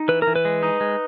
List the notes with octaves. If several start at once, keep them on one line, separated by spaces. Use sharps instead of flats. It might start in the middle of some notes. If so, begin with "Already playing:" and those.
Already playing: D#4
E3 B4
A#4
E3
B4
G#3
D#4
G#3